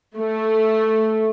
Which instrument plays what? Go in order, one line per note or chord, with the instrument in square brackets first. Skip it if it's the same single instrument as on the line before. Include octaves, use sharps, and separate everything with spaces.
[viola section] A3